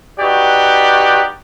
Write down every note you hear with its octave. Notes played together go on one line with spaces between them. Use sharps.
D#4 F#4 G4 B4 D5